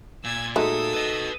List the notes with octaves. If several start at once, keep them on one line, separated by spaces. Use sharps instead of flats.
A#2 E6 G#6
G#3 A3 D#4 F#4 A4 D#6 E6
B4 D#5